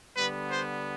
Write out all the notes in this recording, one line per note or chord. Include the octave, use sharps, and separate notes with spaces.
D3 G3 B3 B4
C5